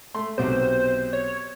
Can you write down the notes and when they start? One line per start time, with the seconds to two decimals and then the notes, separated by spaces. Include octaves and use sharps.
0.14 A3 C6
0.38 B1 C3 C5
1.13 C#5